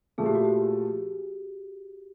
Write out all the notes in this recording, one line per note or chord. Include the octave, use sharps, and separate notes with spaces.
A#2 F3 A3 G#4
G4
F#4
G4